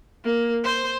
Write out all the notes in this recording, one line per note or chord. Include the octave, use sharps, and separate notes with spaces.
A#3
C5